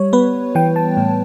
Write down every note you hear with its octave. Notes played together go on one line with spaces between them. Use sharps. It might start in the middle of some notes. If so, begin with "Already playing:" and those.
Already playing: G3 C#5
B3 B4
E3 G5
A5
A2